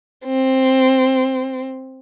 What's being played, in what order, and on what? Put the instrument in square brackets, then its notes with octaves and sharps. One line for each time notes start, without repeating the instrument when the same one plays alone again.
[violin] C4